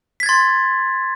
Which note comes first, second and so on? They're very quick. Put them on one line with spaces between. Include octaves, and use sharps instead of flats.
B6 G#6 A6 C6